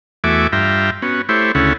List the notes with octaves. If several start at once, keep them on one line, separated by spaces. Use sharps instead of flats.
E2 A3 F#4 E5 G#5 D6
G2 F4 E5 G5 A#5
B3 C#4 F#4
A3 E4 G4 C5 C#5
D2 C#3 C#4 E4 A4 F#5